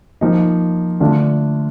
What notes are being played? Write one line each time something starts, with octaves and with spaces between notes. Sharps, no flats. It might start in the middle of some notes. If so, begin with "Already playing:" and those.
F3 A#3 D#4
D3 A3 D4 F4